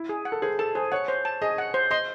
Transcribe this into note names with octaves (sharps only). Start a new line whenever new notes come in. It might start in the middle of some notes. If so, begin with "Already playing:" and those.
Already playing: E4
G#4
F#5
A4
G#4 C5
A4 A5
G#4 C5
C#5 F#5
C5
A5
G#4 D#5
F#5
C5
D#5 C6